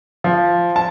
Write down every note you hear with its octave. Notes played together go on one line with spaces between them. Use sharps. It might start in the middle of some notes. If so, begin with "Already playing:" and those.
F3
A5